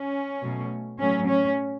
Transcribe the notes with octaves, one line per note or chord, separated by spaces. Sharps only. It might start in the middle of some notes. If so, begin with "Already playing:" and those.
Already playing: C#4
B2 F#3 A3
A2 F#3 A3 C#4
C#4